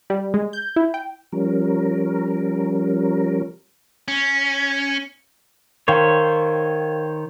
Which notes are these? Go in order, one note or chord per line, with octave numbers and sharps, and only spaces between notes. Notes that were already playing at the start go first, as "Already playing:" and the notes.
G3
G#3
G6
E4
G5
F3 G3 C#4 A#4
C#4
D#3 A#4 C5 C#5 F5 G5